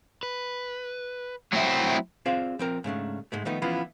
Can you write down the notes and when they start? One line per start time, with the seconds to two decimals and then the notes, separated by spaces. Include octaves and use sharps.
0.23 B4
1.53 F#3 A3 C4 E4 E5
2.26 C4 F4 G#4 C5 D5 F5
2.59 F3 C4 A#4
2.84 G#2 C#3 A3 D4
3.32 G#2 G#3 A3
3.45 D#3 F3 A3 B3 D#4
3.62 E3 F3 B3 C#4 E4 F4